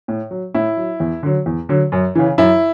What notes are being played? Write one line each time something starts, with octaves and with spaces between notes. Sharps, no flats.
A2
F#3
A2 E4
F#3
E2
D3 F#3
E2
D3 F#3
F#2
C#3 E3
F#2 E4